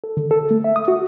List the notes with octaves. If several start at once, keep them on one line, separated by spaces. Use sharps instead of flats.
A4
D3
A4
A3
E5
D#6
F#4